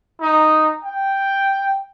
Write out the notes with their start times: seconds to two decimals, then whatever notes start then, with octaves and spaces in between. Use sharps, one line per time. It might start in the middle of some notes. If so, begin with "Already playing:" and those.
0.21 D#4
0.85 G5